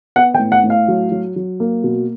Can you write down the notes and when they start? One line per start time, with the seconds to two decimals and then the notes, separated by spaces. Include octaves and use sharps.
0.16 B3 F#5
0.34 G5
0.39 A2
0.52 F#5
0.64 A2
0.70 F5
0.88 F#3
1.12 F#3
1.36 F#3
1.60 A#3
1.84 B2